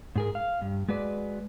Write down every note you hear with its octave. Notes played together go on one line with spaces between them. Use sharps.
G#2 G#4 A#4
F5
G2
G#3 F#4 B4 D5